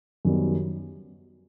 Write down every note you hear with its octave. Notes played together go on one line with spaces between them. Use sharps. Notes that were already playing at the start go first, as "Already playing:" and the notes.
F#2 D#3 G3 B3